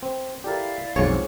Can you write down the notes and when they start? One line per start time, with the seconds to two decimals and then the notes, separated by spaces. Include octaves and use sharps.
0.03 C4
0.44 E4 G4 A4 A#4 D5 F5
0.96 B1 F2 G#2 F4 G#4 C#5 G#5